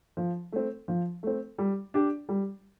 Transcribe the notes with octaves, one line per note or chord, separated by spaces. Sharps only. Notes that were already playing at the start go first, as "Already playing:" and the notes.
F3
A3 C4
F3
A3 C4
G3
D4 G4
G3